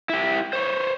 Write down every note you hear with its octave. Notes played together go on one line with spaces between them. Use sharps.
E4 G4
C5 C#5